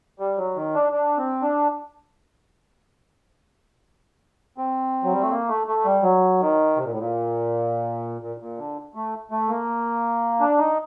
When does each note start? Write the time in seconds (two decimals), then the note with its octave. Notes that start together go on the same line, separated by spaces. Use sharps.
0.20 G3
0.38 F#3
0.56 D#3
0.75 D4
0.93 D4
1.18 C4
1.42 D4
4.58 C4
5.04 F#3
5.13 G3
5.21 A3
5.30 A#3
5.49 A3
5.67 A3
5.85 G3
6.03 F#3
6.40 D#3
6.77 C3
6.84 A#2
6.91 A2
6.99 A#2
8.21 A#2
8.40 A#2
8.58 D3
8.95 A3
9.31 A3
9.49 A#3
10.40 D4
10.59 D#4